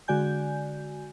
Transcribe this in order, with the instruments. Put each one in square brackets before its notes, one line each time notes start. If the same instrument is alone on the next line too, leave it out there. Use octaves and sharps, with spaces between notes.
[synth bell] D3 G#3 F#4 D5 G#5 G6